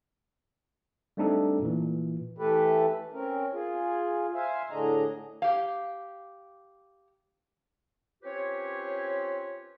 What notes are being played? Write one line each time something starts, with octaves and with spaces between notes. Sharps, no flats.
G3 A3 C4 D4 D#4 A4
A#2 E3
E3 A3 G4 A4 B4
C4 C#4 A#4
F4 G#4
C5 E5 F5 G#5
A2 D3 D4 G#4 D#5 A#5
G4 F5
C4 C#4 F4 G4 B4 C#5